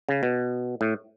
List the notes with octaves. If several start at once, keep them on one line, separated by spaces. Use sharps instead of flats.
C#3
B2
A2